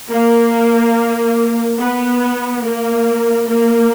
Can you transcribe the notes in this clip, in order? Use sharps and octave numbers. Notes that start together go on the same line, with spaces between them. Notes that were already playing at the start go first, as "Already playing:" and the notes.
A#3
B3
A#3
A#3